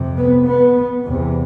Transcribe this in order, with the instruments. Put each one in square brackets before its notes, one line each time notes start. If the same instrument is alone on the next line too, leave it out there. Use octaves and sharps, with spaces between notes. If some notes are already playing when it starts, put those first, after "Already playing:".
Already playing: [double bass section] F2 C3
B3
B3
E2 C3